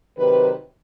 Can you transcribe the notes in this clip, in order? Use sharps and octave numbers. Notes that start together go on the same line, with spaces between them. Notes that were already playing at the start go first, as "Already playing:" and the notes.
C3 D#3 F#3 B4